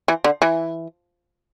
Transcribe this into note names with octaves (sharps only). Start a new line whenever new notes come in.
E3
D3
E3